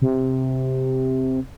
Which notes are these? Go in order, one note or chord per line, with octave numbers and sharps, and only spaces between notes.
C3